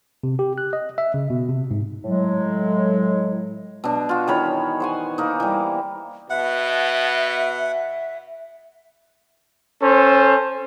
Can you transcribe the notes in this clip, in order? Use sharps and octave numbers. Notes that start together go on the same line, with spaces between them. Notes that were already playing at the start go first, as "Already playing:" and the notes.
C3
G4
F#6
D#5
E5
C#3
B2
C3
G#2
A2 F#3 G#3
B2 D4
F4 F#4
D#3 E3 C#5 B5
C5 F#5 G#5
A#3 D#4
E3 G3
B2 E5 F#5
C#4 A4 C5